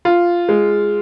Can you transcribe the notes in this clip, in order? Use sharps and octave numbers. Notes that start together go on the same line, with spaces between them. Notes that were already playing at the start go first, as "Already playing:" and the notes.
F4
G#3